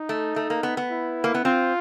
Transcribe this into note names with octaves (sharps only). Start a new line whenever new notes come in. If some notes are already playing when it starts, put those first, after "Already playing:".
Already playing: D#4
A3
A3
A#3
B3
B3
E4
A#3
B3
C4 F4